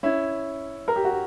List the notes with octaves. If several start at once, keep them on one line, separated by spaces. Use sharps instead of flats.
C#4 E4
A#4
G4
F#4